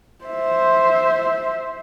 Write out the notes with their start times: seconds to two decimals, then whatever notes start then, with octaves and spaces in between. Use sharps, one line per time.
0.25 C5 E5